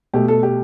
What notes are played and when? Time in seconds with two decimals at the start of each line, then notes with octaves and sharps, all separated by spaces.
0.14 B2 A3 G4
0.28 A4
0.43 G4